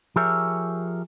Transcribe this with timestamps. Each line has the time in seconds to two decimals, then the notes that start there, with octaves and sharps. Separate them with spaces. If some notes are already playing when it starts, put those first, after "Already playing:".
0.16 F3 G4 G#4 A#4 C#5 E5